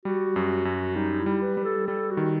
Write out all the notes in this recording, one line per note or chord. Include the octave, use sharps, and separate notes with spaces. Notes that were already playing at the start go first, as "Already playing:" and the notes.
G3 F#4
F#2
F#2
G3 D#4
E4
G3
B4
G3
A4
G3 A4
F#4
D#3